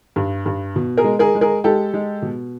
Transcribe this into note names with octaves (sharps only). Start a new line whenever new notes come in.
G2
G2
B2
G#4 A#4
G#3
G#4 A#4
G#3
G#4 A#4
G#3 G4 A4
G#3
B2